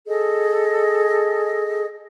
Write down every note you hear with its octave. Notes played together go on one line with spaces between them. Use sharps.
G#4 A4 D#5